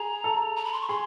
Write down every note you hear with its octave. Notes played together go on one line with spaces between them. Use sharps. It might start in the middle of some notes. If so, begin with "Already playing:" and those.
Already playing: G#4 A#5
A4
A#5
B5
C6
C#6
G#4 C6